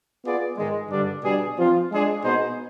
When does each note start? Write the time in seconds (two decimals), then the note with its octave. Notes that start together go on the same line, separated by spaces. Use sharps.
0.25 B3 F4 G#4 D5
0.57 G#2 D#3 G#3
0.90 G2 D3 G3 D4
1.23 B2 G3 D4 G#4
1.58 F3 C4 F4
1.91 G#3 D4 G#4
2.23 B2 B3 D#4 G#4 C5